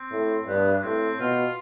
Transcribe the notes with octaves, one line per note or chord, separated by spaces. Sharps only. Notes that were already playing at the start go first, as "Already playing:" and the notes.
Already playing: C4
A2
G2 B3
D4
A2 C4
B2 F4